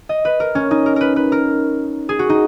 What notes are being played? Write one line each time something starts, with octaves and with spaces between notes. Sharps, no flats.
D#5
B4
A#4
C#4
D#4
A#4
A#4 B4
B4
A#4
G#4
F#4
D#4